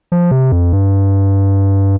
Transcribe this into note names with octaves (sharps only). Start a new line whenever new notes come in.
F3
C3
F2
G2